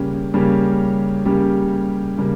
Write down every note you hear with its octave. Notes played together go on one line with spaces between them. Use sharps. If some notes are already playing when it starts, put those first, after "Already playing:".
Already playing: C#3 G3 A#3 C#4 G4
C#3 G3 A#3 C#4 G4
C#3 G3 A#3 C#4 G4
C#3 G3 A#3